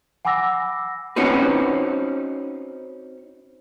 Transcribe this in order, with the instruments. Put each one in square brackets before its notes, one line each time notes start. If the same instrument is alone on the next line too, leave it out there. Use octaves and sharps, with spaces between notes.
[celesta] F#5 G#5 B5 D6 E6 A#6
[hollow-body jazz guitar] C4 C#4 D#4 F#4 B4